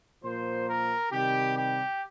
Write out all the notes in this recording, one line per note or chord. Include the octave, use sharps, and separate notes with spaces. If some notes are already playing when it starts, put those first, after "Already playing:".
A#2 F3 A#3 C5
A#4
C3 D#3 G3 G4
G4